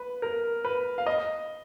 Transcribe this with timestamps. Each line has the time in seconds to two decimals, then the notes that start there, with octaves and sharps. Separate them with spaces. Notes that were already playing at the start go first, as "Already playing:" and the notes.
Already playing: B4
0.22 A#4
0.65 B4
0.98 F5
1.06 D#5